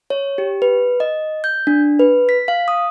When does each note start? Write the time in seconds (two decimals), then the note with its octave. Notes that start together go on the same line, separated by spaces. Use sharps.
0.10 C#5
0.38 G4
0.62 B4
1.00 D#5
1.44 G6
1.67 D4
2.00 B4
2.29 B6
2.48 F5
2.68 D#6